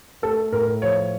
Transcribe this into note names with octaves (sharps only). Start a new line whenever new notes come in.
A3 A4
A2 A#4
F3 C#5